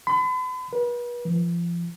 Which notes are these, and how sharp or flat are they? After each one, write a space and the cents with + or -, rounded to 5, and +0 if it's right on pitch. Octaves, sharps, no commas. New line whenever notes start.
B5 +40
B4 -40
F3 -30